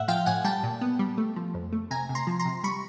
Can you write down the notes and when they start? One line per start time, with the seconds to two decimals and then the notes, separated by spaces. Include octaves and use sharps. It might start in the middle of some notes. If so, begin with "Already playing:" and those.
Already playing: A2 E5 F#5
0.08 F3 F5 G5
0.26 A2 F#5 G#5
0.44 G3 G5 A5
0.63 A#2
0.81 B3
0.99 G3
1.18 A3
1.36 F3
1.54 F2
1.72 A3
1.90 C3 G#5 A#5
2.09 C3
2.15 A#5 C6
2.27 F3
2.39 A#5 C6
2.45 C3
2.64 G3 B5 C#6